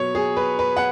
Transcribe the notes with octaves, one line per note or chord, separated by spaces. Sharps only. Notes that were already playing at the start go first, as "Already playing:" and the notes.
Already playing: B2 F#3 B3 C#5
G#4
B4
B4
F#5